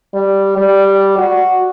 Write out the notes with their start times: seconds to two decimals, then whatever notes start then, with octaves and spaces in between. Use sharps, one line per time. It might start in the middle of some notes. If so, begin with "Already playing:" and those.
0.14 G3
0.57 G3
1.18 F#4